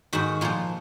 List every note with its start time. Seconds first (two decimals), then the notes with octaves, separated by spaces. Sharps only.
0.13 G#2 D#3 F#4
0.41 A#2 F3 F4